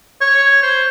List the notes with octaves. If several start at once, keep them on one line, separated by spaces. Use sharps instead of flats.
C#5
C5